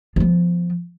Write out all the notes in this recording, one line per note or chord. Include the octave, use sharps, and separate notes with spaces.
F3 B3